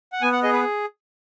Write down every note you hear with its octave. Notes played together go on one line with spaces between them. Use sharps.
F#5
B3 G#5
F#5
G#4 D#5
B4